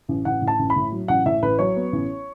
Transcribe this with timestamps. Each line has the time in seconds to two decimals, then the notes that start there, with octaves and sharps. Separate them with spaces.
0.09 A1
0.25 A1 F#5
0.42 A2
0.48 A5
0.59 A1
0.70 B5
0.76 A2
0.92 F#3
1.08 A1 F#5
1.26 A2 E5
1.42 A1 B4
1.59 F#3 C#5
1.76 B3
1.92 A1